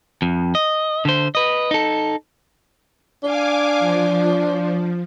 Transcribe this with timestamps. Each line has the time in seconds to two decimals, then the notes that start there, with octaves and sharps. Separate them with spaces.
0.22 F2
0.55 D#5
1.05 D3 C5
1.35 B4 D#5
1.71 D#4 A4
3.23 D4 F5 G#5 D6
3.80 F3